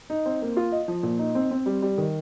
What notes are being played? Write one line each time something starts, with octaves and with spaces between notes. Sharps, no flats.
D#4
C4
A#3
F4
D#5
F3
A#2
D#4
C4
C4
G3
G3
D#3